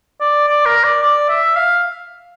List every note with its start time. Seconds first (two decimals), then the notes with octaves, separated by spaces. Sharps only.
0.21 D5
0.48 D5
0.66 A#4
0.84 D5
1.02 D5
1.29 E5
1.56 F5